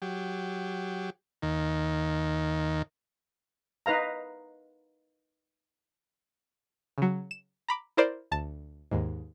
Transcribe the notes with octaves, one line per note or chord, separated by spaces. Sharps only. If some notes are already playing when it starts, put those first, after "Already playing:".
F#3 G4
D#2 D#3
D#4 B4 F5 A#5
C#3 F#3
E7
A#5 B5 D6
E4 A#4 C5 D5
D2 A5
D#2 G#2